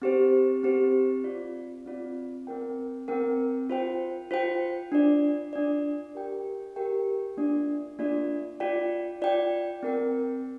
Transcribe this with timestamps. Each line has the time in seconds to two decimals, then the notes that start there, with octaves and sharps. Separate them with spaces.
0.02 C4 G4 C5
0.63 C4 G4 C5
1.24 C4 F4 D5
1.86 C4 F4 D5
2.47 C4 A#4 G5
3.08 C4 A#4 G5
3.69 F4 C5 G5
4.31 F4 C5 G5
4.92 D4 F4 D5
5.53 D4 F4 D5
6.15 G4 A#4 G5
6.76 G4 A#4 G5
7.37 A#3 D4 F4 D5
7.99 A#3 D4 F4 D5
8.60 F4 D5 G5
9.22 F4 D5 G5
9.83 C4 A#4 G5